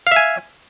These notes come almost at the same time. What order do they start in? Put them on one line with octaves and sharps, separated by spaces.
F5 E5 G#5